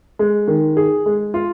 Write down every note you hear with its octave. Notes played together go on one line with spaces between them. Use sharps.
G#3
D#3
G#4
G#3
F4